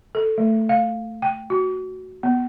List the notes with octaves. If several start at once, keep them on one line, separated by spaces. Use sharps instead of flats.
A4
A3
F5
G5
F#4
B3